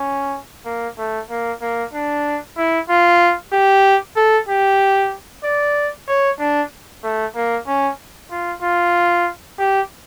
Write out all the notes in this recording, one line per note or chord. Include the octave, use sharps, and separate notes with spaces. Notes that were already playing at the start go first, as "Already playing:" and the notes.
Already playing: C#4
A#3
A3
A#3
A#3
D4
E4
F4
G4
A4
G4
D5
C#5
D4
A3
A#3
C#4
F4
F4
G4